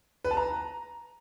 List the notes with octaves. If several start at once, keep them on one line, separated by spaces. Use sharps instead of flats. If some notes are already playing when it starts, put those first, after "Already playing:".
B4
A5
A#5